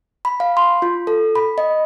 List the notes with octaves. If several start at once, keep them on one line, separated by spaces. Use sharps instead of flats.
B5
F5
C6
F4
A4
B5
D#5